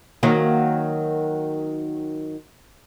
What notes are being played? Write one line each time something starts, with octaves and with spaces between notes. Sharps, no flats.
D#3 F#3 A#3